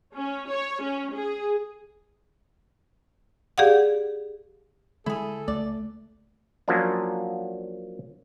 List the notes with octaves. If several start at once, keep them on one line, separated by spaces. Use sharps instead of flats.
C#4
C#5
C#4
G#4
G4 G#4 D5 F5 F#5
D3 G#3 E4 G#4 A4
C#2 A3 D5
F3 F#3 A#3 C#4 D4